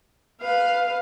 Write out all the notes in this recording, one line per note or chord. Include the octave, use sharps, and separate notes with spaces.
B4 F5